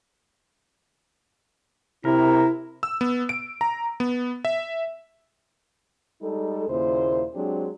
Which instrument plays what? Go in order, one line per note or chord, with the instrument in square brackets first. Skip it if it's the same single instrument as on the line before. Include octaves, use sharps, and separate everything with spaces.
[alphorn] C3 [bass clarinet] E4 [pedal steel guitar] A#4
[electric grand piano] E6
B3
D7
A#5
B3
E5
[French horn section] G3 G#3 D#4 A4
D#2 A#2 C#3 E4 C5
F#3 G#3 C4 D4 G4 G#4